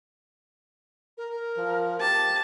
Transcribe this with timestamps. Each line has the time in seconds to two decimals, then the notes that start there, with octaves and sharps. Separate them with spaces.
1.18 A#4
1.57 F3
2.00 G4 A5